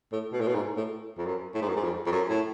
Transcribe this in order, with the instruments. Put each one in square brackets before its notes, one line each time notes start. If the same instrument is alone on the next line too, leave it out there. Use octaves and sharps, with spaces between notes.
[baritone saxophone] A2
B2
A2
B2
G#2
A2
F2
F#2
A2
G#2
F#2
G#2
F2
F2
F#2
A2